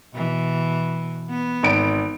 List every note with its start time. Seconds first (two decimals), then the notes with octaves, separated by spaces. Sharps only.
0.14 B2 E3
1.29 B3
1.63 G#1 D7